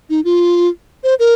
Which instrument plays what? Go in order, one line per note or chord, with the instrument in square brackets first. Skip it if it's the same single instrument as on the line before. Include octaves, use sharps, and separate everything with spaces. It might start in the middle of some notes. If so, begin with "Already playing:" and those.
[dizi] D#4
F4
C5
A#4